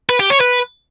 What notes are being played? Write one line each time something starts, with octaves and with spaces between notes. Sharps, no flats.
B4
G4
C#5
B4